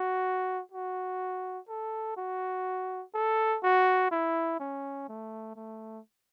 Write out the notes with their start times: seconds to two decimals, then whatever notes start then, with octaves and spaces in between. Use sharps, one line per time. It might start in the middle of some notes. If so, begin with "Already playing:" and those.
Already playing: F#4
0.71 F#4
1.68 A4
2.17 F#4
3.14 A4
3.63 F#4
4.11 E4
4.60 C#4
5.08 A3
5.56 A3